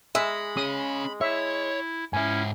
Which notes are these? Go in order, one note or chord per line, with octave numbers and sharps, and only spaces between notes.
G#3 E5 B5
C#4 G#4 D#6
E4 C#5 E5
G#2 C#4 E4 E5 G#5